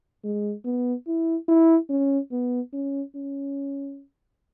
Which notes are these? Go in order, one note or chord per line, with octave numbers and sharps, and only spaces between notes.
G#3
B3
E4
E4
C#4
B3
C#4
C#4